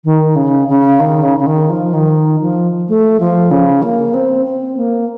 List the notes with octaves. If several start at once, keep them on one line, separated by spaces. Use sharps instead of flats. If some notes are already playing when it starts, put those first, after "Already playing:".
D#3
C#3
C#3
D#3
C#3
C#3
D#3
F3
D#3
F3
A3
F3
C#3
A#3
C4
C4
A#3